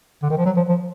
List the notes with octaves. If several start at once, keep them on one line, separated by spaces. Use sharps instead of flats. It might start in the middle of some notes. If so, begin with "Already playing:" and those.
D3
D#3
F3
F#3
F3
F3